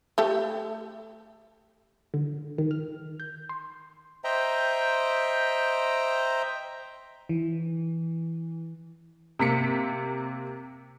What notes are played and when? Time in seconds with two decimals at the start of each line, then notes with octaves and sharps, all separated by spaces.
0.18 A3 G4 A4
2.14 D3
2.58 D#3
2.71 F6
3.20 G6
3.49 C6
4.24 C5 D#5 E5 G5 A#5
7.29 E3
9.39 C3 A#3 B6 C#7